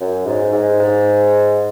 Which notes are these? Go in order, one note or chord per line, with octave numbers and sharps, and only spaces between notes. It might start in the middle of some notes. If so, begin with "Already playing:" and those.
F#2
G#2
G#2
G#2